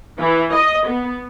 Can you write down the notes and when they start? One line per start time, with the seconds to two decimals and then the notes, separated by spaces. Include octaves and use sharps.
0.21 E3
0.54 D#5
0.88 B3